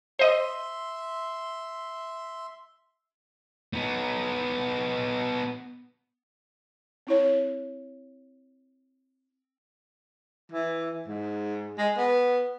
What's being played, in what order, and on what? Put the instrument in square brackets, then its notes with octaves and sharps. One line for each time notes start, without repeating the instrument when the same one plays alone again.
[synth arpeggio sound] C5 D#5 [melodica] E5 C6
[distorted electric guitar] B3 D#4
[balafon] C4 E4 C#5
[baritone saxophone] E3
G#2
G#3
B3